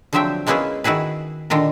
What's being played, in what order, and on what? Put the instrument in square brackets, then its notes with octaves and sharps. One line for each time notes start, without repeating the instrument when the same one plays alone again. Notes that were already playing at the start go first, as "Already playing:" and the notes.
[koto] D3 F3 F#3 C4 E5 G5
G#3 A#3 B3 C#4 E4 G#4
D#3 E4 F#4 G#4 B4
A#2 D3 D#3 F4 A#4